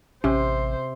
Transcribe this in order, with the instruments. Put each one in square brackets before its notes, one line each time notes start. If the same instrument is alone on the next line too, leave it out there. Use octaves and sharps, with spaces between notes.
[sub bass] A1 [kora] C3 [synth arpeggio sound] C#4 [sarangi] C5